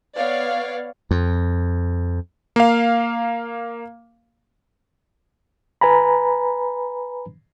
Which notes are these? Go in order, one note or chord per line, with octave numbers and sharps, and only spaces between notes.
B3 C#5 D5 F5
F2
A#3 F5
B4 G#5 A#5 B5